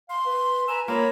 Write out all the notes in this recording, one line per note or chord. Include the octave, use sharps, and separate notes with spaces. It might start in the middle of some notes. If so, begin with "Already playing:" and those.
F5 C6
B4
B4 G#5 A#5 E6
A#3 F4 C#5 A#5 B5